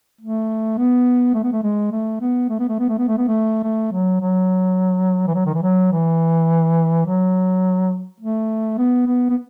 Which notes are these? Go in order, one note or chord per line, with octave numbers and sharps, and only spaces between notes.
A3
B3
A3
B3
A3
G#3
A3
B3
A3
B3
A3
B3
A3
B3
A3
B3
A3
A3
F#3
F#3
E3
F#3
D#3
E3
F#3
E3
F#3
A3
B3
B3
B3